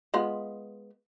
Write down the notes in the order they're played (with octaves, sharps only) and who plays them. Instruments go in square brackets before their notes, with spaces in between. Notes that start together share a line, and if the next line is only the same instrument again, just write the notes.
[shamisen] G#3 B3 F4